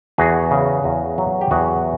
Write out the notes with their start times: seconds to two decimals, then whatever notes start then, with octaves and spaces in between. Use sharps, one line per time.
0.18 E2 F#4 G#4
0.51 C#3
0.84 E2
1.18 F#3
1.41 G4
1.51 E2 F#4 G#4